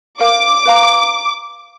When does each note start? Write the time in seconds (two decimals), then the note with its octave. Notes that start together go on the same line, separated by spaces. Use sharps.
0.20 A#4 C5 F5 D6
0.66 B4 F5 A#5